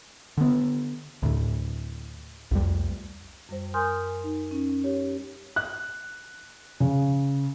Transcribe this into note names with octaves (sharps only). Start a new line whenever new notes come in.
D3 B3
D2 A2
C2 F2 G3
F#2 G3 C5
A#4 G#5 C6 D#6 F6 G6
D#4
C#4 D#4
G4 C#5
F#6
C#3